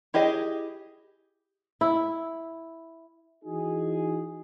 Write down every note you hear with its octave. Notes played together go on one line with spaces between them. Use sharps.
E4 G4 G#4 D#5
E4
E3 D#4 F#4 G#4